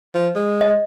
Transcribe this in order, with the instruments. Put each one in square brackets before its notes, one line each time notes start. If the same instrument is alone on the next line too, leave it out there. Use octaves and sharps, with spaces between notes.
[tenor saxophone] F3
G#3
[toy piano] D#5